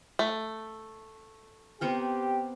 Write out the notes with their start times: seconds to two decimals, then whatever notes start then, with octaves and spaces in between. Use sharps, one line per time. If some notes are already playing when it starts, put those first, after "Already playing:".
0.19 A3
1.81 B3 C4 G4 A#4